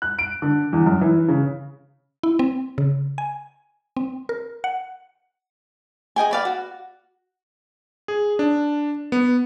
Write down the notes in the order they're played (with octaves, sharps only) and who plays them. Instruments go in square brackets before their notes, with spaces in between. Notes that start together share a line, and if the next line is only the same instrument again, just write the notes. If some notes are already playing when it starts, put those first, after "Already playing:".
[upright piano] F#6
D7
D3
E2
F#2
E3
C#3
[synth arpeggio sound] E4
C4
C#3
G#5
C4
A#4
F#5
[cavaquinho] G#4 D#5 G5 G#5
B4 D5 F5
F#4
[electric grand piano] G#4
D4
B3